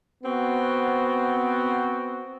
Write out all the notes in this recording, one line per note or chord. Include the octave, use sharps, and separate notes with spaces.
B3 C4 F#4